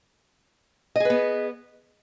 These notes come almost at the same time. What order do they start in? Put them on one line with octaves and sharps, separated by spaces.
D#5 G#4 B4 B3